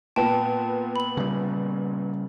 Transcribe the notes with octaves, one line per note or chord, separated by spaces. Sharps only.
A#2 B3 G5 A5
B5 F#7
C#3 G3